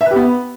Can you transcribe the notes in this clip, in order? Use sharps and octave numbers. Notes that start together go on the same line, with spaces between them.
E5
B4
G4
B3